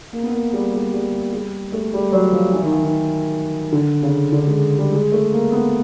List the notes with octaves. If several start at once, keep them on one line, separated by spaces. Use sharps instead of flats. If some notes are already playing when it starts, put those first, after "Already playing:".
A#3
B3
A#3
G3
G3
G3
G3
A3
G3
F#3
F3
E3
D#3
E3
D#3
D3
C#3
D3
G#3
G3
G#3
A3
A#3
B3